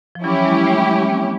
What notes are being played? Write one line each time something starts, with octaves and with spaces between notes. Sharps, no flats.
F3
E3 F#3 C#4 E4 G4
F#3 G#3
G3 A3
F#3 G#3
A#3 C4